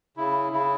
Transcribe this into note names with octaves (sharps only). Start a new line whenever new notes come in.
C#3 E4
C#3 E4